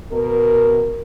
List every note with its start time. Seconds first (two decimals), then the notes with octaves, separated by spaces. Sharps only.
0.12 B2 A#4